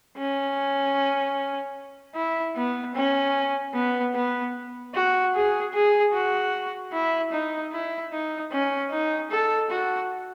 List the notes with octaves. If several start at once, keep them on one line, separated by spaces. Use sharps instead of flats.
C#4
E4
B3
C#4
B3
B3
F#4
G#4
G#4
F#4
E4
D#4
E4
D#4
C#4
D#4
A4
F#4